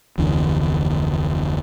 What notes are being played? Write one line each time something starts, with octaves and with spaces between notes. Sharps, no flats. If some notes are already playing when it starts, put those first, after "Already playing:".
F1 D2 E3 D4